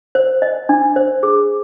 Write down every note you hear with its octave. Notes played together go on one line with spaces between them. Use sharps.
C5
D#5
D4
C5
G#4